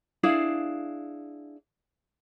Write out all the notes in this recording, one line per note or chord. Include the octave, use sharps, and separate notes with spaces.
D4 E4 G#4 F5